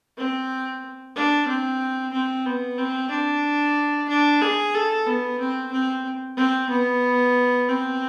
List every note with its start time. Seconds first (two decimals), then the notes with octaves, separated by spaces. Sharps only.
0.18 C4
1.16 D4
1.48 C4
2.13 C4
2.46 B3
2.78 C4
3.11 D4
4.09 D4
4.41 G#4
4.74 A4
5.06 B3
5.39 C4
5.72 C4
6.37 C4
6.69 B3
7.68 C4